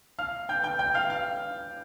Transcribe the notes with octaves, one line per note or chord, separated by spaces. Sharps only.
F5 F6
G5 G6
G5 G6
G5 G6
F5 F6
F5 F6